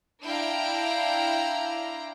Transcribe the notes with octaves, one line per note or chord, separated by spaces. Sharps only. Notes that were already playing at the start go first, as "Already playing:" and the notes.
D4 E4 F5 G5 A#5